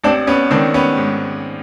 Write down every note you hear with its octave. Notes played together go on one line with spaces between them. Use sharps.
A1 C4 D4
B3 C#4
D#3 C4 D4
B3 C#4
G#2